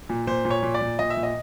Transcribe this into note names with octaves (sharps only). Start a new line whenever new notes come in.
A#2
A#2 C5
A#2
C#5
A#2
D5
A#2
A#2 D#5
E5
A#2
D#5